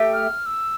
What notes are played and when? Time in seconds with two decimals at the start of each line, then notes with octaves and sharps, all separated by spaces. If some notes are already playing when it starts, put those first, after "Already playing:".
Already playing: A3 G4
0.13 F6
0.46 E6